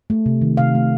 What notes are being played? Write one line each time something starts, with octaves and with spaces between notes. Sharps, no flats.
A3
C3
D#3
C3 F5
A3